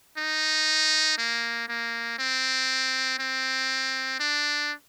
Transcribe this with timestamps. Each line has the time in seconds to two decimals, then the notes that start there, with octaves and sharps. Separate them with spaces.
0.18 D#4
1.18 A#3
1.68 A#3
2.18 C4
3.19 C4
4.20 D4